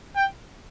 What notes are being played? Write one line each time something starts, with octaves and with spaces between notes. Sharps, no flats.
G5